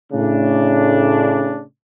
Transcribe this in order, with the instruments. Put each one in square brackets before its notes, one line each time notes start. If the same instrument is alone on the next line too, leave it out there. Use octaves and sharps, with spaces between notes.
[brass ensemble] A2 C#3 A3 D4